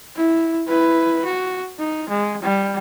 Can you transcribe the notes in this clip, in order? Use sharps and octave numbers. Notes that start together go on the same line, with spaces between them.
E4
E4 B4
F#4
D#4
G#3
G3